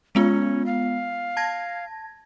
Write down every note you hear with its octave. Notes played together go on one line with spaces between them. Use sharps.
G#3 B3 C#4 F4
F5
A5 G#6 A#6